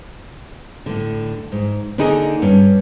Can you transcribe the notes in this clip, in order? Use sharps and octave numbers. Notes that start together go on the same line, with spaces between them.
A2 D3
G#2
D3 A#3 D4 D#4 G#4
G2 C#4